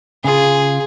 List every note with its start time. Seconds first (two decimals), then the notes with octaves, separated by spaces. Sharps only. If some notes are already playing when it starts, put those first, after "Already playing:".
0.24 C#3 F4 G#4